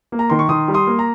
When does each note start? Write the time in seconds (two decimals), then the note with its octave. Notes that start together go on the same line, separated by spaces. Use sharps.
0.12 A#3
0.19 A#5
0.30 D#3 C6
0.39 C#6
0.49 D#3 C6 D#6
0.68 G3
0.74 C6 D#6
0.87 A#3
0.99 A#5